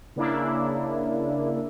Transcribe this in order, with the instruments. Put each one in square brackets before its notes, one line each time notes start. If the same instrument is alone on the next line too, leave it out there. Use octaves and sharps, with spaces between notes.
[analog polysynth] C#3 A#3 D4 E4